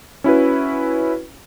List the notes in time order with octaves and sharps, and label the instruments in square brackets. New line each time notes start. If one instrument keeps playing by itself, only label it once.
[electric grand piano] C#4 E4 F#4 B4